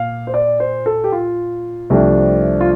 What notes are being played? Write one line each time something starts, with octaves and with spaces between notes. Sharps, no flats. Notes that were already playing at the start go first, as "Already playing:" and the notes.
Already playing: A#2 F5
C5
D5
C5
A4
G4
F4
C2 C3 F3 A3 D4
F4